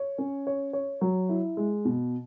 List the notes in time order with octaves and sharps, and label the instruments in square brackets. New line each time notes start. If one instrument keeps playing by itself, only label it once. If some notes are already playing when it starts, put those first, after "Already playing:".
Already playing: [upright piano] C#5
C#4
C#5
C#5
F#3
E4
G#3
B2